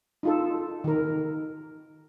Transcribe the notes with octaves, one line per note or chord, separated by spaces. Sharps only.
D#4 F4 A4
D#3 A#4